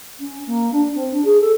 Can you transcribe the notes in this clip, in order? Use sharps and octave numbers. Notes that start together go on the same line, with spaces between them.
C#4
A#3
D4
C4
D4
G#4
A4